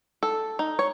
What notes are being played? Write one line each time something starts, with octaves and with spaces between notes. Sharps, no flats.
A4
D#4
C#5